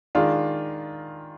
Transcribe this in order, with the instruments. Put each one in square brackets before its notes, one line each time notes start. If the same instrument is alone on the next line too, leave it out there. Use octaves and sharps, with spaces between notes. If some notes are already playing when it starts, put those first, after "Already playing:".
[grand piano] D#3 G#3 D4 F4